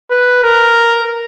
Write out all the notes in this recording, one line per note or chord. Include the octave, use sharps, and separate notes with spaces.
B4
A#4